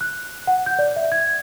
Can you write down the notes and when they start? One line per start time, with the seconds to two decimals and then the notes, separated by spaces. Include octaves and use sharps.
0.01 F#6
0.47 F#5
0.66 G6
0.79 D5
0.96 E5
1.12 G#6